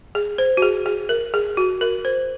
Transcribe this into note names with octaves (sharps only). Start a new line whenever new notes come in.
G#4
C5
F#4
G#4
G#4
A#4
G#4
F#4
A#4
C5